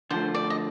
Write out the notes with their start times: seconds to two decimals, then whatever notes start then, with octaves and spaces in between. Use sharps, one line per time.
0.10 D3 F3 A3 C5
0.34 D5
0.50 D#5